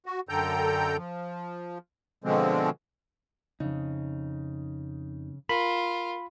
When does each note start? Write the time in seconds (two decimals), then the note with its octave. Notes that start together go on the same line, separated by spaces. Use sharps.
0.06 F#4
0.29 F#2 D3 A4 G5 A#5 G6
0.97 F3
2.24 B2 D3 F3 G#3 C4
3.60 F2 C#3 D#4
5.49 F4 A#4 B5